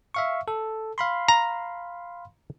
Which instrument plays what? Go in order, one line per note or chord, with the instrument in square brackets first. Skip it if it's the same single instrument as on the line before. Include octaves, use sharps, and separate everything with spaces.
[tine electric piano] E5 F5 C#6
A4
F5 B5 C6
[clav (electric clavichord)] A#5